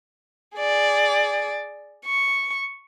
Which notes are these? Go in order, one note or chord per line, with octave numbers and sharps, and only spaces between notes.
G#4 D5
C#6